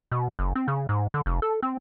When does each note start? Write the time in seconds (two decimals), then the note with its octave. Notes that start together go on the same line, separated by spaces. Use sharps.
0.12 B2
0.39 F#1
0.55 C4
0.68 C#3
0.89 G#2
1.14 D3
1.26 F1
1.42 A4
1.63 C4